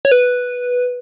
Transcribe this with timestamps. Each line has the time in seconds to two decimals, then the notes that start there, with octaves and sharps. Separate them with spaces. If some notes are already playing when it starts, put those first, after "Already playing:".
0.05 C#5
0.12 B4